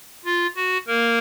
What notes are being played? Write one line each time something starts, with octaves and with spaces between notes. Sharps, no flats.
F4
F#4
A#3 A#4